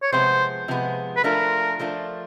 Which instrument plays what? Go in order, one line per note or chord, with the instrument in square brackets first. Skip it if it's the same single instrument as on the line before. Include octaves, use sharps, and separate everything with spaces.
[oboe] C#5
[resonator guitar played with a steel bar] C3 F3 G#3 B3 [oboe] C5
[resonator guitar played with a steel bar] C3 F3 G#3 B3
[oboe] B4
[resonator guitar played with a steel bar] F3 A3 D4 F4 [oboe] A#4
[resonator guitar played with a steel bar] F3 A3 D4 F4